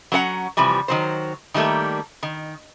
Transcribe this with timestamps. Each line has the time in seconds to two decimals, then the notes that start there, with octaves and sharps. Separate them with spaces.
0.12 F#3 C#4 B4 F#5 A#5
0.57 C3 E3 F3 G3
0.88 D#3 F#3 C5
1.54 D#3 F#3 G3 A3 A#3
2.23 D#3